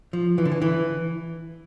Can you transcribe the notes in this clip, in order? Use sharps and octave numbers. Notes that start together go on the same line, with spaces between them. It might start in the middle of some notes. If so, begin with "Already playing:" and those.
F3
E3
D3
E3
E3